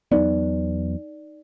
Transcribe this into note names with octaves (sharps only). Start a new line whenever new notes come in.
E2 F#3 B3 D#4 D5